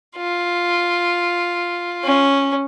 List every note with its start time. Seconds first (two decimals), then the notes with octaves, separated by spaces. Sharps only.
0.18 F4
2.04 C#4